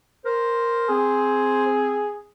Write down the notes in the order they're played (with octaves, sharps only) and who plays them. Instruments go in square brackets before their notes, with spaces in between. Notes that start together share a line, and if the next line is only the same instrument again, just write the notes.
[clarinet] A#4 [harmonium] C5
[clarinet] C4 [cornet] G#4